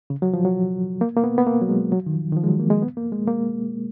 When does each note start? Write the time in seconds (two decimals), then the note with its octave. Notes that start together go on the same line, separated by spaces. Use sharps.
0.10 C#3
0.22 F#3
0.34 F3
0.45 F#3
1.01 A#3
1.17 A#3
1.24 B3
1.38 B3
1.47 A#3
1.62 F#3
1.69 G#3
1.92 F#3
2.06 D#3
2.14 F3
2.32 D#3
2.37 F3
2.44 G#3
2.48 F#3
2.60 A#3
2.70 G#3
2.82 B3
2.97 A#3
3.12 G#3
3.27 A#3